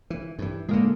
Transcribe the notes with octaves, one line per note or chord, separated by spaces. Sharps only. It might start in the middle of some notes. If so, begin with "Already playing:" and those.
E3
G2 E3
A2 D3 G#3 A#3